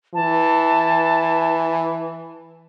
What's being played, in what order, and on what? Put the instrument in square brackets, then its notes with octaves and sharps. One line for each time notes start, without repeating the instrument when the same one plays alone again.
[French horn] E3 [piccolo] A5